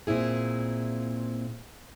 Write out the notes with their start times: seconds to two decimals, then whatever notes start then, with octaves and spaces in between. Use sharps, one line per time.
0.07 A#2 C4 E4 G#4